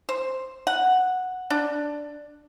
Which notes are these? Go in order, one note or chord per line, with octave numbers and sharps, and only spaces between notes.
C5
F#5
D4